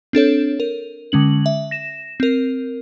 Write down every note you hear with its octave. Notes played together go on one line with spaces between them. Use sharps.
C4 D4 A4 C#5
A#4
D3 G#3 C#4 F#7
E5
A#6 E7
C4 A#4